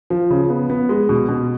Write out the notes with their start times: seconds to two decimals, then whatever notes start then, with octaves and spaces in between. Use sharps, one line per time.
0.10 F3
0.30 C#3
0.50 B3
0.70 B3
0.89 G#3
1.09 B2
1.29 B2